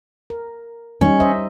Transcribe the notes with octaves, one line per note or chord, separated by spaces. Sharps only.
A#4
G3 C#4 D#4
C5 D#5 E5